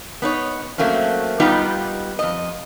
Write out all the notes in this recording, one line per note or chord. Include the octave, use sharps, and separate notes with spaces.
B3 D#4 C#5
F#3 A3 A#3 C4 C#4
G3 B3 D#4 F4 G4
F2 D#5